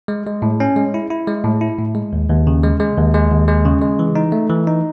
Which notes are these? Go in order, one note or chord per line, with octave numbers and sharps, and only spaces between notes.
G#3
G#3
A2
C#4
G#3
E4
E4
G#3
A2
E4
A2
G#3
D#2
D#2
C#3
G#3
G#3
D#2
G#3
D#2
G#3
C#3
G#3
E3
D#4
A3
E3
D#4